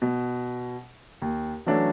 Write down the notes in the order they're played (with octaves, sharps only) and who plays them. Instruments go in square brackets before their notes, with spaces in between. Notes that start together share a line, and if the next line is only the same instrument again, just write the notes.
[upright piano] B2
D#2
E3 F#3 A3 C#4 D4 E4